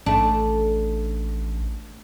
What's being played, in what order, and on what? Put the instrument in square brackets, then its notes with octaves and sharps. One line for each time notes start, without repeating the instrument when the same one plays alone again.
[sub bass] A1 [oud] A3 D4